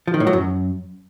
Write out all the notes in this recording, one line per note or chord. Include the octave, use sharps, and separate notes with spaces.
F3
D#3
A2
F#3
F#2